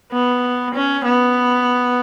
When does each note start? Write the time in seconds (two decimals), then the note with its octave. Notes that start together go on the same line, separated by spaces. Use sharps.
0.12 B3
0.74 C#4
1.05 B3